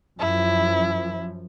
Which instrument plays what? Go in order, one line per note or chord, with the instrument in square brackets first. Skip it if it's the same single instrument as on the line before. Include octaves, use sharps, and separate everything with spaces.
[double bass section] F#2 F3 [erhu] E4